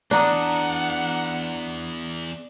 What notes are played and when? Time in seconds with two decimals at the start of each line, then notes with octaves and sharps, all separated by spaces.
0.11 E2 D4 D5 F#5 A#5 D#6